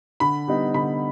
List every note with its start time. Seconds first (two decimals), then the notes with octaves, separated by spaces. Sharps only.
0.20 D3 B5
0.48 G3 B3 D#4
0.74 D3 B5